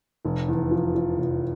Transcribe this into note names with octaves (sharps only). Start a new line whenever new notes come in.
F1
E2
F3
F3
F1